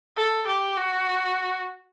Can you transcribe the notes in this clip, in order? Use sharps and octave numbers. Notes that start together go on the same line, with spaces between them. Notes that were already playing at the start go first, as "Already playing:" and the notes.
A4
G4
F#4